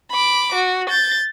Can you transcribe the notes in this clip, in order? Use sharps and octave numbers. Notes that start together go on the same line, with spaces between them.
B5 D6
F#4
G6 A6